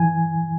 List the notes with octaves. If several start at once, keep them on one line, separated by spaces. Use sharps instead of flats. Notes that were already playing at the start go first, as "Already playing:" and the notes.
Already playing: E3 G#5